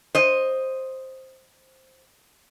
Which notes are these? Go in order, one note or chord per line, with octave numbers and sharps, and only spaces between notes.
C5 D#5